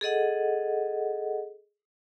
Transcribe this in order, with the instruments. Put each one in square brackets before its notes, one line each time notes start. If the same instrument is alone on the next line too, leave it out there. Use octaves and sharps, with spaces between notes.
[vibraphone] G#4 A4 D#5 F#5